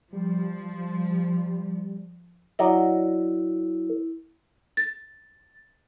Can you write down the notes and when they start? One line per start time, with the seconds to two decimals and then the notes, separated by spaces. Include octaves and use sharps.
0.13 F3 G3
2.59 F#3 E4 D5 D#5
4.77 A6